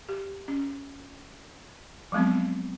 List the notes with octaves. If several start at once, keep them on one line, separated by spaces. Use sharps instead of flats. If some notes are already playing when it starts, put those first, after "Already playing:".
G4
C#4
F3 F#3 G#3 B3 C4